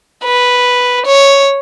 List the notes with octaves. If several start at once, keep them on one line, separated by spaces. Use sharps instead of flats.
B4
C#5